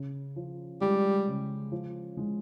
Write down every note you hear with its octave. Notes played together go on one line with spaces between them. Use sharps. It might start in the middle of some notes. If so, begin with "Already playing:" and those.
Already playing: C#3
F3
G3 G#3
C#3
F3
G#3